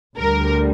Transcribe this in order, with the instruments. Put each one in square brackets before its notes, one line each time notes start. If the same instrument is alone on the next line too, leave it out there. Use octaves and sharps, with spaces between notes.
[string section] D2 D3 G3 A#4